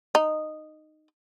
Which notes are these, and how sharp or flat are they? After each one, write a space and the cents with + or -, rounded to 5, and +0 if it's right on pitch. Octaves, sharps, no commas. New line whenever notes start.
D#4 -10